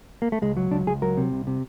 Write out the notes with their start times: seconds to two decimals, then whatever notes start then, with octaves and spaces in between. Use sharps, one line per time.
0.22 A#3
0.32 A3
0.42 C#2 G#3
0.57 F#3
0.71 C#2 D4
0.87 C#2 G#4
1.02 F#3 A#4
1.17 C3
1.32 C2
1.47 C3